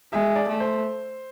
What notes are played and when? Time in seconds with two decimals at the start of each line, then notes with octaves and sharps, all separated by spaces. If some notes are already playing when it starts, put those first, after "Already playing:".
0.12 G#3 E5
0.36 D5
0.48 A3
0.60 C5